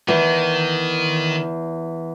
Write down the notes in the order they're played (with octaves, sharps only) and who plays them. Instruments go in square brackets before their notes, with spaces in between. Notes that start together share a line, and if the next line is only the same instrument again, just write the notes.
[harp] E2 [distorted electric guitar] D#3